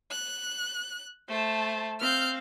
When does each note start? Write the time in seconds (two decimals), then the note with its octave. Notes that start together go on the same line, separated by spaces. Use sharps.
0.11 F#6
1.29 A3 C5 A5
2.00 C4 F5 F6 G6